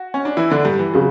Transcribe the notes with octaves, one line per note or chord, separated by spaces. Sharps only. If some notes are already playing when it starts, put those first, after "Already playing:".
Already playing: F#4
C#4
D4
E3 E4
D3 D4
G2 G3
E3
C#3 F#3